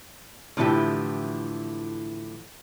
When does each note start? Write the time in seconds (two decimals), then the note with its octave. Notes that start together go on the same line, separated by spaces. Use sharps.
0.57 A2 D3 E3 F3 E4 G4